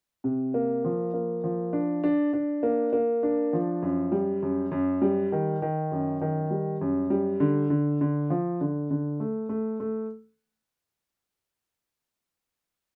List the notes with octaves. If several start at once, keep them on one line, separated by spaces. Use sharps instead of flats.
C3
A#3
F3
A#3
F3
D4
D4
D4
A#3
A#3
D4
F3
F#2
G3
F#2
F#2
G3
D#3
D#3
F#2
D#3
G3
F#2
G3
D3
D3
D3
F3
D3
D3
A3
A3
A3